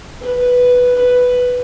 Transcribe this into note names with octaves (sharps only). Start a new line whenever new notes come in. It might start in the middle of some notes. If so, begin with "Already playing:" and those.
B4
B4